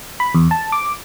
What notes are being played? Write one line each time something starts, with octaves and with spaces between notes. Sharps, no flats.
B5
E2
A5
D6